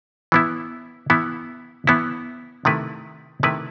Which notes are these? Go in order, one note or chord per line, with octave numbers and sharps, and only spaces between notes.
E3 B3 E4
E3 B3 E4
E3 B3 E4
C3 D#3 A3 E4 B4
C3 D#3 A3 E4 B4